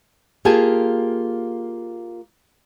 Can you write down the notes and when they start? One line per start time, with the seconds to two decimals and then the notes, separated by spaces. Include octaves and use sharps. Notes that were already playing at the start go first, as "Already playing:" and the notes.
0.45 A#3 F4 G4 G#4 G#5 A5